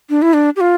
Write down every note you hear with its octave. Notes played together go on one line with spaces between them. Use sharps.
D4
E4
D4
G4
F4